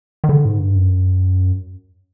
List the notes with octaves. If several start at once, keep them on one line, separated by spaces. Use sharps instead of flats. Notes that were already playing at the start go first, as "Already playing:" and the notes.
D#3
D3
G#2
G2
F#2